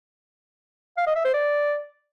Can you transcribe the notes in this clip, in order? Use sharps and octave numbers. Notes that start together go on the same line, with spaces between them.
F5
D#5
E5
C5
D5